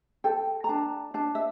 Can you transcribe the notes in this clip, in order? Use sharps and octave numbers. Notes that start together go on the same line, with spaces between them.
A4 G5
A#5
D4 A5
D4 A5
E5